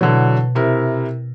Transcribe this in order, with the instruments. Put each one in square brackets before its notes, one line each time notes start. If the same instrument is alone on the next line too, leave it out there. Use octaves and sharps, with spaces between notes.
[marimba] B2 [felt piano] D3 E3 F#3
[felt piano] C3 E4 A#4